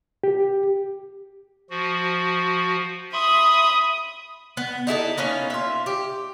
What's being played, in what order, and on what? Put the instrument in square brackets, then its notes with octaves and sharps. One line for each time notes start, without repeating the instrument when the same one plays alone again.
[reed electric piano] G4
[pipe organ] F3 F#4
[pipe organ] E5 B5 C6 [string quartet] D#6
[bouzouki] B3
D#4 E4 G#4 A4
A#3 B3 C#4 D#4
F4 E5
G4